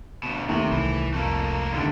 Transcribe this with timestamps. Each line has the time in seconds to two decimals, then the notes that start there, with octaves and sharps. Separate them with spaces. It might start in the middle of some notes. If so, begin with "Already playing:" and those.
0.23 D2 B2
0.49 D#2 C3 A3 C#6
0.72 C2 E3
1.14 F2 A3 A#3
1.73 G#1 D2 D3 G3